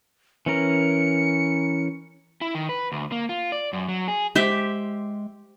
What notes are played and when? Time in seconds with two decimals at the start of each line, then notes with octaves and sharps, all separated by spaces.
0.46 E3 C#4 A#4 C#7
2.41 E4
2.55 D#3
2.69 B4
2.92 D2
3.12 A#3
3.29 F4
3.52 D5
3.73 F#2
3.89 F#3
4.08 G#4
4.35 G#3 G4 C5 E5